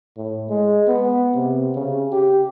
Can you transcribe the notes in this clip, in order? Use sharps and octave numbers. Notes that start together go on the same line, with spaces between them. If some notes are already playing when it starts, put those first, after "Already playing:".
A2
G#3
B3
C3
C#3
G4